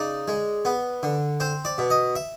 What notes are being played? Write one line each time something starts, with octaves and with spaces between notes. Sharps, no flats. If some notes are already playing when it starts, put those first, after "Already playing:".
Already playing: C#3 D#4 D5
G#3
B3
D3
C4 C5
D5
B2
D#5
E5